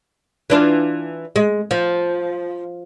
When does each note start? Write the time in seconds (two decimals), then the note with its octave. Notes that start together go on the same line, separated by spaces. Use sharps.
0.50 E3 D4 F4
1.36 G#3
1.71 F3